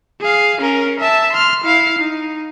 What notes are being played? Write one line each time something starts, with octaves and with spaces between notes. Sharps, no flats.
G#4 F5
C#4 A#4
E5 A5
C6 F6
E4 F5
D#4